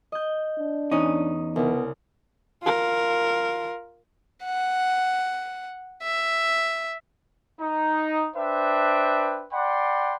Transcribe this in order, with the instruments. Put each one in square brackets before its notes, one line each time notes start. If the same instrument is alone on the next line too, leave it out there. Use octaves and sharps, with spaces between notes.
[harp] D#5 G6
[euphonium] D4
[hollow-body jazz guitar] E2 C#4 D#4 [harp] D#6
[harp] C2 C#3 [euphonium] B3
[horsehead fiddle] F4 A#4
[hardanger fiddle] F#5
E5
[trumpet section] D#4
D4 B4 C5 E5 G5
D5 F#5 G5 B5 C6